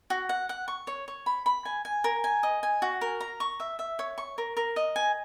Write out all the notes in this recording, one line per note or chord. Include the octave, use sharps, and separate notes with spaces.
F#4
F#5
F#5
C#6
C#5
C#5
B5
B5
G#5
G#5
A#4
G#5
D#5
G#5
F#4
A#4
A#5
C#6
E5
E5
C#5
C#6
A#4
A#4
D#5
G#5